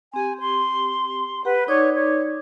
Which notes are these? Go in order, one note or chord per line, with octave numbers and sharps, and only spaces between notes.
C4 G4 G#5
C6
G4 B4 F#5 B5
D#4 C#5 D5 D6
C#5